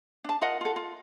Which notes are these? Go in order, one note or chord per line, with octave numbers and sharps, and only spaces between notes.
D4 A5
F4 A#4 D#5 F#5
F4 A4
F4